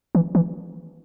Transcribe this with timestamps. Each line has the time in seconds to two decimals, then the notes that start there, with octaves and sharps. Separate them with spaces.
0.15 E3
0.35 E3